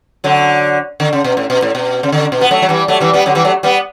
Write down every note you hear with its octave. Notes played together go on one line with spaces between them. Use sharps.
D3 F#3
D3
C#3
B2
A2
B2
A2
B2
C#3
D3
B2
B3
F#3 A3
F#3
E3 G3
F#3 A3
E3 G3
G3 B3
D3 F#3
E3 G3
F#3 A3
G3 B3